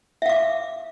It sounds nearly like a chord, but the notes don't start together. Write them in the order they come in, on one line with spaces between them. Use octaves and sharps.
E5 F5 D6